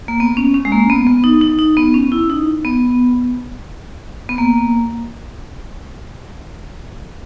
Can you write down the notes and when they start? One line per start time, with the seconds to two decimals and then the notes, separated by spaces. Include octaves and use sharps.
0.08 A#3
0.20 B3
0.37 C#4
0.54 C#4
0.65 G#3
0.72 A#3
0.90 B3
1.07 B3
1.24 D#4
1.41 D#4
1.59 D#4
1.77 B3
1.94 C#4
2.12 E4
2.30 D#4
2.65 B3
4.29 B3
4.38 A#3